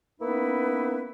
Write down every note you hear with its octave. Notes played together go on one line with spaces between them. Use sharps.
A#3 B3 C#4 D#4 E4 B4